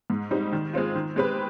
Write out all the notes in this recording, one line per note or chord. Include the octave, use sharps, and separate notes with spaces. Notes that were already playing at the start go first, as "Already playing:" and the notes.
G#2
G3 C4 D#4
D#3
G#3 C4 F4
D#3
G#3 C4 G4 B4